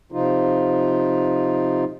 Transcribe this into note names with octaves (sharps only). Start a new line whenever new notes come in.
C3 F3 D#4 F4